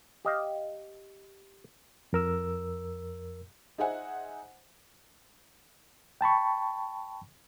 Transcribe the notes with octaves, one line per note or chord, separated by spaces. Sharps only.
G4 D#5 F5
F2 A#4 E6
D#4 G#4 C5 E5 F#5 G#5
G5 A5 B5 C#6